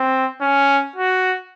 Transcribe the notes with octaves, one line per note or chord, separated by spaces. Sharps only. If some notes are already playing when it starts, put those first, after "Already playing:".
Already playing: C4
C#4
F#4